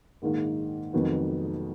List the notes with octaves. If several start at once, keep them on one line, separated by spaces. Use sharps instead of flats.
A#1 G#2 D#3 A#3 D#4
F1 F2 D#3 F#3 B3